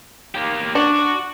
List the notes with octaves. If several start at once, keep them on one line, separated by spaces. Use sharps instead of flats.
A#3 G4
D4 F#4